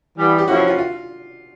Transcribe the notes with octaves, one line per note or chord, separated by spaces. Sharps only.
E3 G3 B3
G4
F3 A#3 C#4 E4 F#4
F4
F4
F4